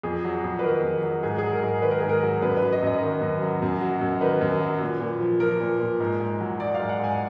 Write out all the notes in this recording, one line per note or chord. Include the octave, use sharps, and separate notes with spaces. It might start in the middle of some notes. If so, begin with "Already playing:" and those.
F2 G#4
F#3
F2
B4
D#3 A#4
F2
F#3
G#2 G#4
F#3 G#4
A#4
G#2
A#4
D#3 B4
A#4
G#2 G#4
A#4
F#3
F#2 B4
F#3 B4
D#5
F#2 D#5
D#3
F#2
F#3
F#2
F#3
F#2
D#3 B4
F#2
F#3
A#2
A#2
F3
F3 A#4
A#2
A#2
G#2
G#2
F#3
F#3 D5
G#2 F5
F#5
G#2 G#5